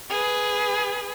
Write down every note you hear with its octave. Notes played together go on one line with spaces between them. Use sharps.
G#4 B4